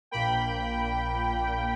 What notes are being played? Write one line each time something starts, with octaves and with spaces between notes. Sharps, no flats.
A#1 A#2 A#3 G5 B5